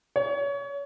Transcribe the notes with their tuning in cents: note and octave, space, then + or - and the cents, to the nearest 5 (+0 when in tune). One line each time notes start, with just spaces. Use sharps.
C#5 +30